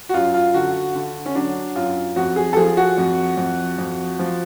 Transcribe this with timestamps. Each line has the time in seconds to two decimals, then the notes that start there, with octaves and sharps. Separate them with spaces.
0.09 F#4
0.14 F#2 F4
0.34 F4
0.54 D3 F#4
0.95 D3
1.26 C#4
1.35 F#3 D4
1.75 F#2 F4
2.16 F2 F#4
2.36 G#4
2.53 A4
2.57 F3 G#4
2.77 F#4
2.98 F2
3.37 F2
3.78 F2
4.19 F3